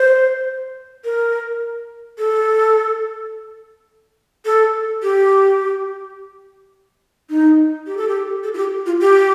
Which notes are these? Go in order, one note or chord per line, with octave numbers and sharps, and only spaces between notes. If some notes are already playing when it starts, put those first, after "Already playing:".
Already playing: C5
A#4
A4
A4
G4
D#4
G4
A4
G4
A4
F4
G4
F4
G4